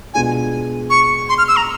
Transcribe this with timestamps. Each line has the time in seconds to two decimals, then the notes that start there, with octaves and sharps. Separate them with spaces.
0.14 B2 G#3 B3 D4 F4 G#5
0.90 C#6
1.29 C6
1.38 F6
1.48 E6
1.56 A#5